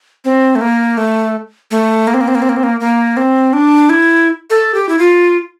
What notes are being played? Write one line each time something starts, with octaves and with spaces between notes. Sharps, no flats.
C4
A3
A#3
A3
A3
A#3
C4
A#3
C4
A#3
C4
A#3
C4
A#3
A#3
C4
D4
E4
A4
G4
E4
F4